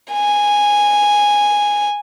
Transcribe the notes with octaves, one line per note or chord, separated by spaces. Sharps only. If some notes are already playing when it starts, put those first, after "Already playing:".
G#5